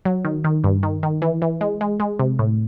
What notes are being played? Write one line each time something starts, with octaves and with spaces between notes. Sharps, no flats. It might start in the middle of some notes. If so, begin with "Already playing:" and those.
F#3
D#3
D#3
G2
D#3
D#3
E3
E3
G#3
G#3
G#3
C3
A2